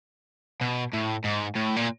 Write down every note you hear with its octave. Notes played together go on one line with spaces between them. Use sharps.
B2
A2
G#2
A2
A#2